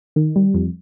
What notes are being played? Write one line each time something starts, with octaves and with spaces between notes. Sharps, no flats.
D#3
G3
F2